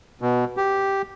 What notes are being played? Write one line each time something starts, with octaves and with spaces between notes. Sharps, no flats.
B2
G4